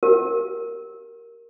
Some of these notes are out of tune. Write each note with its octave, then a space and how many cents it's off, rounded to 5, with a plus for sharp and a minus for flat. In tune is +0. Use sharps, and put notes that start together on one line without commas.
G4 -15 A#4 +0